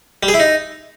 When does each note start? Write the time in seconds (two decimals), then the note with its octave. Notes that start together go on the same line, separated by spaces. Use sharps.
0.23 G3
0.28 G#4
0.34 E4
0.40 D#4